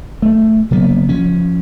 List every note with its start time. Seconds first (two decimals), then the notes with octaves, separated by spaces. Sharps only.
0.22 A3
0.71 C#3 F#3 A#3 B3
1.09 F3 C#4